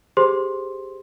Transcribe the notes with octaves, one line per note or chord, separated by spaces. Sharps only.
G4 G#4 C5 C6